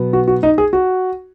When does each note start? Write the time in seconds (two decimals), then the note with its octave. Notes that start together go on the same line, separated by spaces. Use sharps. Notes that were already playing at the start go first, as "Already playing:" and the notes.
Already playing: B2 F#3 B3
0.13 F#4
0.28 F#4
0.43 D#4
0.58 G#4
0.73 F#4